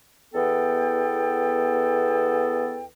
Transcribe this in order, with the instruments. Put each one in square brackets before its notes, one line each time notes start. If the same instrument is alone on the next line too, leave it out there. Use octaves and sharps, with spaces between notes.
[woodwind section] E2 E3 B3 A4 G5